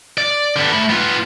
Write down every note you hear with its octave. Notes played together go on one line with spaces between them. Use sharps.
D5
D3 B3
A3 B5
B3 F4